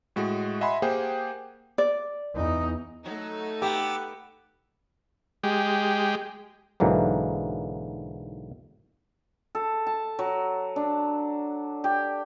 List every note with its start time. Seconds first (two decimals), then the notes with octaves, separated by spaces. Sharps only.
0.16 A2 G#3 F#4
0.61 D#5 E5 F#5 G#5 B5 C6
0.82 A#3 G4 G#4 C5 F#5 G5
1.78 D5
2.35 E2 D#4
3.06 F#3 A3 D#4
3.62 B3 G4 D6 E6
5.43 G#3 G4
6.80 B1 G#2 D3 E3 F#3 A#3
9.55 A4
9.87 A5
10.19 F#3
10.76 D4
11.84 G4